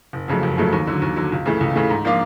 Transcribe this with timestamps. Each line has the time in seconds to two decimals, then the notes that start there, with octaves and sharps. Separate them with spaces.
0.13 F#1
0.28 F2 C#3 F#3 A3
0.43 F#1
0.57 F2 C#3 F#3 A3
0.73 D#2
0.87 D3 F#3
1.02 D#2
1.16 D3 F#3
1.32 C#2
1.46 C#3 E3 A3
1.60 C#2
1.76 C#3 E3 A3
1.90 G#2
2.05 F3 A#3 D4 F4